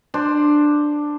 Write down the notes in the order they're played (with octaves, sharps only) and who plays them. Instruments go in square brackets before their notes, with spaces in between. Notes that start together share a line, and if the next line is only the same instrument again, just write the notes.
[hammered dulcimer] D4 C5